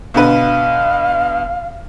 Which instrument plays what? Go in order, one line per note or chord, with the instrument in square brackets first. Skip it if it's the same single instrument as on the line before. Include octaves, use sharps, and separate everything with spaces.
[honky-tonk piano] B2 D3 B4 [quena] F5